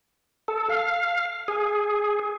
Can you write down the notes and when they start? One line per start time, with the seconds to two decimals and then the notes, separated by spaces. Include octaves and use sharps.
0.48 A4
0.69 F5
1.48 G#4